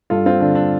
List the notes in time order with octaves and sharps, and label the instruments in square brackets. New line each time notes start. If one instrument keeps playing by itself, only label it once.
[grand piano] G2 F4 A4
C4 F4
D3 D4
D4